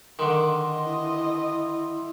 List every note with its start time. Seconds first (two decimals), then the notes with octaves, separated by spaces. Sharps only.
0.19 D3 D#3 C6
0.50 D#5
0.86 E4